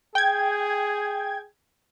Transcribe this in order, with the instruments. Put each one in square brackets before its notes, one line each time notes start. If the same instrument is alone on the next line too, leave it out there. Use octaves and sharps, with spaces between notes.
[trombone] G#4 [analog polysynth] G5 G#6